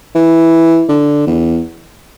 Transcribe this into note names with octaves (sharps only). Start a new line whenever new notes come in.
E3
D3
E2